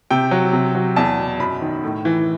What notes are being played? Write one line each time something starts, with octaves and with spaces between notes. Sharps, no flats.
C3 G5
F#3
C3
F#3
E2 A5
B2
F#2 B5
D#3
A2
E3